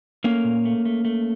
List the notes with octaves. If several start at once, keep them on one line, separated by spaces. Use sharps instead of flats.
A3 A#3 C#4
A#2
A3
A3
A3